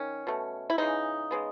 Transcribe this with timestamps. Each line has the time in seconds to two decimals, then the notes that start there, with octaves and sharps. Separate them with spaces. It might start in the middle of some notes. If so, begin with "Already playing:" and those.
Already playing: D#3 C#4
0.27 B2 A3
0.70 E4
0.78 C#3 E3 G#3 D#4
1.31 C#3 G#3 B3